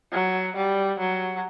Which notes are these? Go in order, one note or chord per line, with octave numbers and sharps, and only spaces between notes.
F#3
G3
F#3